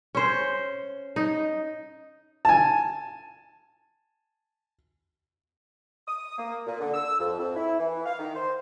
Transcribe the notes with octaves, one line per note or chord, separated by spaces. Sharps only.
C#4 C5
D#4
G#5 A5
D#6
A#3
A#2
D3
E6
F2
F2
E4
E3
F5
D#3
C5